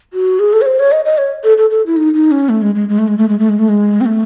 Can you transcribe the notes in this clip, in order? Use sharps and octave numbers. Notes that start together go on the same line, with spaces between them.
F#4
G#4
A4
C#5
C5
C#5
D#5
D#5
C#5
A4
A4
A4
E4
D#4
D#4
C#4
A3
G#3
G#3
G#3
A3
G#3
A3
G#3
A3
G#3
A3
G#3
C4
A3